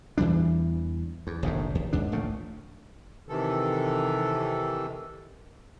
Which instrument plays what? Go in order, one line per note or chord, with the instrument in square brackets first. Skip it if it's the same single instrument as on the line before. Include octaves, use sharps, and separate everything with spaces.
[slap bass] E2 E3 G3 D4
E2
F1 A#1 G#2 D#3
D#2
D#2 G#2 D4
D1 A#1 A#2 A3
[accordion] C3 D#3 E3 A4